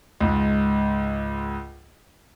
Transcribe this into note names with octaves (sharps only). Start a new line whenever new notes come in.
C#2 G#2